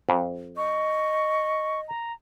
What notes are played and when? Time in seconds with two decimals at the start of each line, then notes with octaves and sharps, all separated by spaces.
0.09 F2
0.57 D#5 C#6
1.88 A#5